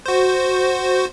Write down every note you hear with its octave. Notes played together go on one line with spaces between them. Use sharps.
F#4 C5